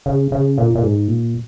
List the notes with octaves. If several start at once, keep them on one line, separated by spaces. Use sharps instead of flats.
C#3
C#3
A#2
A#2
G#2
A#2